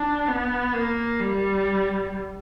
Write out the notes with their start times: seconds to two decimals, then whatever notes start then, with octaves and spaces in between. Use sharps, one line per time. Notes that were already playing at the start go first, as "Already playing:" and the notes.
Already playing: D4
0.28 B3
0.73 A#3
1.19 G3